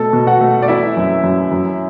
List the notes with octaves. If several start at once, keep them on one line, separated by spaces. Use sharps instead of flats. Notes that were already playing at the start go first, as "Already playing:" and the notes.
Already playing: B2 A3 A4 A5
B2
F#4 F#5
A3
D5
E3 E4 E5
F#2
F#2
F#2